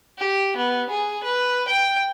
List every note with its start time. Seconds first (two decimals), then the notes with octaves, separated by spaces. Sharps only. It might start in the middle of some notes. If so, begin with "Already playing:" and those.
0.18 G4
0.56 B3
0.90 G#4
1.23 B4
1.68 G5